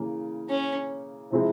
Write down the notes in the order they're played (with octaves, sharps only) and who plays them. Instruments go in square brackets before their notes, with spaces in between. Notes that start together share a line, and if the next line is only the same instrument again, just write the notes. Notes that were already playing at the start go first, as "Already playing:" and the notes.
Already playing: [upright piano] C#3 E3 A#3
[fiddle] C#4
[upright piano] C3 F3 G#3 C4 E4